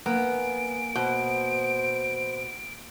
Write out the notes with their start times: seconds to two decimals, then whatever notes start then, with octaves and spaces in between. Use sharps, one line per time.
0.06 A#3 B3 G#5 D7
0.95 B2 C5